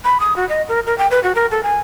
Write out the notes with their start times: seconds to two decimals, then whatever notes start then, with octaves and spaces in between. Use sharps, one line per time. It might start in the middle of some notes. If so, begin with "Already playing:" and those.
0.04 B5
0.20 D#6
0.36 F#4
0.49 D#5
0.68 A#4
0.87 A#4
0.98 G5
1.11 B4
1.23 F#4
1.35 A#4
1.51 A4
1.63 G#5